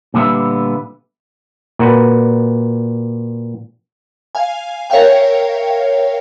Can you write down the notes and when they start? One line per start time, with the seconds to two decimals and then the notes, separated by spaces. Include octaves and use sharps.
0.14 A#2 D3 G3 B3 E5
1.79 A#2 F#4 B4
4.35 F5 G#5
4.90 A#4 C#5 E5 F5 G5